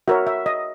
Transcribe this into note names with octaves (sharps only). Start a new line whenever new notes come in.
F#4 A#4 C#5 E5
E5
D#5